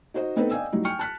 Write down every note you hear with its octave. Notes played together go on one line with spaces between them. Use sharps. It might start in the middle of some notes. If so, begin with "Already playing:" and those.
D#4 F#4 C5 D#5
B3 C4 D#4 A4 B4 C5
D5 D#5 F5 G5 G#5 E6
F#3 G3 D#4 E4
G5 G#5 C#6 F6 C#7
A5 F#6 B6